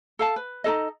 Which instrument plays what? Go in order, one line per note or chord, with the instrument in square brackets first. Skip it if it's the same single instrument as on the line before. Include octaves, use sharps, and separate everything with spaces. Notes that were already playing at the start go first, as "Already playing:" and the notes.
[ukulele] A4 F5 A5
B4
D#4 F4 A4 D#5